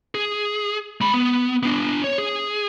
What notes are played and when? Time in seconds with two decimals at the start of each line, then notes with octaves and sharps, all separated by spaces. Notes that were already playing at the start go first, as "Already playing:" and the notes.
0.15 G#4
1.01 G#3 B5
1.13 B3
1.63 B3 D4
2.04 C#5
2.18 G#4